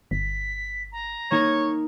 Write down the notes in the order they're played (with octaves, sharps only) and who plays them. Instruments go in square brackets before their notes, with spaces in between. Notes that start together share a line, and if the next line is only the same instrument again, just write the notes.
[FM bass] G1 [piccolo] B6
[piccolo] A#5
[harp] A#3 D#4 A#4 [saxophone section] C#5